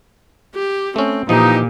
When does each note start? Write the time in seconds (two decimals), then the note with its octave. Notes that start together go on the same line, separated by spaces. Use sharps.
0.55 G4
0.96 A3 C4 C#4
1.29 A#2 E3 F3 D#4 G4